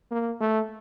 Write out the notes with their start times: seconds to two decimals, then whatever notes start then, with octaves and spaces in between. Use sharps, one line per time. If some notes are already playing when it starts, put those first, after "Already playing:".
0.11 A#3
0.40 A3